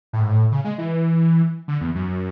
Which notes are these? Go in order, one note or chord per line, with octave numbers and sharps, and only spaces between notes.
A2
G#2
A2
C#3
G#3
E3
D3
E2
F#2